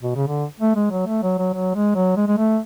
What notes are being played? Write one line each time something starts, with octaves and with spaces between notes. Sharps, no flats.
B2
C#3
D3
A3
G#3
F#3
A3
F#3
F#3
F#3
G#3
F#3
G#3
G#3
A3